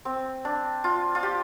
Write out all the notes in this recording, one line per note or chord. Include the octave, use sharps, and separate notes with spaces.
C4
D4
F4
F4
G4